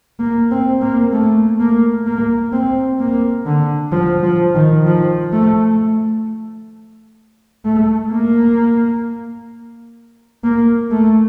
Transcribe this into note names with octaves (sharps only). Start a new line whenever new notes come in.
A#3
C4
A#3
A3
A#3
A#3
C4
A#3
D3
F3
F3
D#3
F3
A3
A3
A#3
A#3
A3